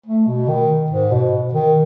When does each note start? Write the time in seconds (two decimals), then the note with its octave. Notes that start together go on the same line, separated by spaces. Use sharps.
0.06 A3
0.27 B2
0.48 D#3
0.91 G#2
1.12 B2
1.54 D#3